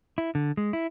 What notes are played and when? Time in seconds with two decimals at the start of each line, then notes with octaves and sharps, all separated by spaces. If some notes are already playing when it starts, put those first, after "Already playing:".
0.18 E4
0.35 D3
0.57 G#3
0.73 E4